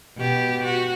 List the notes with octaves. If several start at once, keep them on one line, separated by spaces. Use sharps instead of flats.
B2 G4
F#4